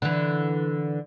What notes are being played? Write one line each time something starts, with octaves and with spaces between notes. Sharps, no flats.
D3 E3